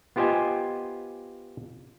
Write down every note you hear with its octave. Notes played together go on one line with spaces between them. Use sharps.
B3 F4 G4 C5 D#5 G#5